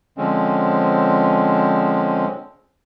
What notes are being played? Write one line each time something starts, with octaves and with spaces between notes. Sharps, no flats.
D3 F3 G#3 C4 C#4